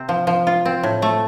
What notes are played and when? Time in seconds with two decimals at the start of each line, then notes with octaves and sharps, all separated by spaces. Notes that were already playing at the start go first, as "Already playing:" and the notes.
Already playing: C3 C4
0.09 F3
0.27 F3
0.47 F4
0.65 C4
0.83 A2
1.02 A3